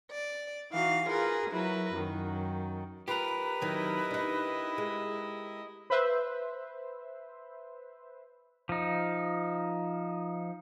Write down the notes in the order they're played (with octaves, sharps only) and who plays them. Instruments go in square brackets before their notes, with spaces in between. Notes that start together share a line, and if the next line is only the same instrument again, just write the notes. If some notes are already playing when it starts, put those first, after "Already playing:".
[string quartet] D5
E3 D#4 F#4 F5
F4 G#4 A#4 B4
F#3 E4 A#4 B4
F#2 D#3
[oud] F4 [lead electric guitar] G4 A#4 [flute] B4
[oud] D#3 F#3 C4 [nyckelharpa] E4 D#5
[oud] D4 D#4
G#3
[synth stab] B4 C5 E5
[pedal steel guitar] F3 D#4